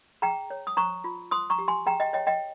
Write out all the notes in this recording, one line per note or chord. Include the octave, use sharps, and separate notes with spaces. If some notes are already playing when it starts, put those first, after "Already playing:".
G#4 G5 A#5
C#5
D#6
C5 A#5 C#6
F4
C5 C6 D#6
A#5 C#6
G4
G#5 C6
G#4 G5 A#5
D#5 G5
C#5 D#5 G5
D#5 G5